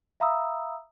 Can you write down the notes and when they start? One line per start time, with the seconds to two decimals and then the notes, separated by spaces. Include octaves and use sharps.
0.20 E5 F5 A#5 B5 D#6 E6